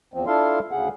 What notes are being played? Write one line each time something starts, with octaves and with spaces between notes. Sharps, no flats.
E2 F3 C4
D4 E4 F4 A4 F5 C6
D2 C#3 G#4 F#5